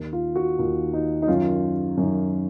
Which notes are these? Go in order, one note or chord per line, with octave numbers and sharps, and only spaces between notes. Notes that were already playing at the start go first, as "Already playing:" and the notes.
Already playing: D#2 D#3
F4
F#4
D#2 D#3 F4
D#4
D#4
F#2 D#3 F4
F#2 D#3